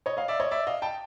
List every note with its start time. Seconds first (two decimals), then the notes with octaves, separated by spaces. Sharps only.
0.06 C#5 D#5
0.17 D#5 F5
0.28 D5 E5
0.40 C#5 D#5
0.51 D5 E5
0.67 D#5 F5
0.82 G5 A5